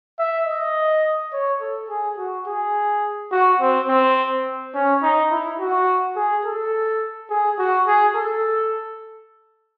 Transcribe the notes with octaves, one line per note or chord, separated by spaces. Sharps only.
E5
D#5
C#5
A4
G#4
F#4
G#4
F#4
C4
C4
C#4
D#4
E4
F#4
G#4
A4
G#4
F#4
G#4
A4